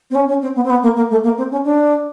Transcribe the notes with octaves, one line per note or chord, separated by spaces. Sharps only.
C4
C#4
C#4
C4
B3
C4
B3
A#3
A#3
A3
A#3
C4
C#4
D4